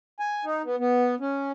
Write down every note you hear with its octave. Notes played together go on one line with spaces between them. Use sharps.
G#5
D#4
B3
B3
C#4